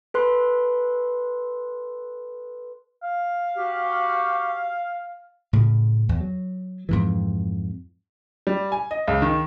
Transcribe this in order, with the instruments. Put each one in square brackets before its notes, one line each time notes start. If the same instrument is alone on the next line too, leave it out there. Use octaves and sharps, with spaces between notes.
[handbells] A4 B4 C6
[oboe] F5
[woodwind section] F#4 G4
[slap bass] A2 C#3
E2
F#3
F2 G#2 E3
[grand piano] G3
G#5
D#5
C#2
D#3